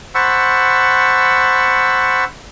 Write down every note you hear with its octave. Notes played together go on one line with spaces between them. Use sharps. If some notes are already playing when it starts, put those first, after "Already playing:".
C5 F#5 A5 B5 C#6 E6